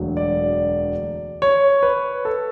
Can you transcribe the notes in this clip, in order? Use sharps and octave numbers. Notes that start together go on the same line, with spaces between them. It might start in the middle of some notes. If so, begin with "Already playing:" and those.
Already playing: E1 D2 D3 F#3
D5
C#5
B4
A4